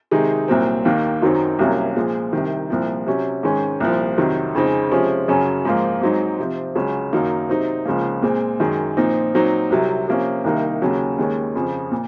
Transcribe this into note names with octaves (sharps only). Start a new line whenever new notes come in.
C3 D#3 G#3 D#4
C2 A#2 F#3 C4
D#2 D#3 A#3
F#2 D#3 F#3 C4 D#4
C2 C3 F#3 A#3 C#4
A#2 F3 G#3
C2 C3 D#3
C2 A#2 F3
C3 F#3 C#4
G#2 D#3 G#3 C#4
C2 A#2 F3
F2 C3 D#3 F#3
F2 C#3 G#3 C4 D#4
C3 F3 G#3 C#4
F#2 C#3 F#3 C#4
G#2 F3 A#3
G#2 F#3 C4 D#4
C3 F3 C4
C#2 C#3 F#3 C#4
F#2 D#3 F#3 A#3 D#4
C3 F#3 C4 D#4
C#2 C#3 F3 A#3
A#2 G#3 C4
F#2 D#3 G#3
A#2 F3 C4 D#4
A#2 F#3 C4 D#4
C2 C3 F#3
C3 F3 A#3 C#4
C2 C3 D#3 A#3 D#4
D#2 C#3 F#3 C#4
D#2 D#3 G#3 C#4
F2 C#3 F3
A#2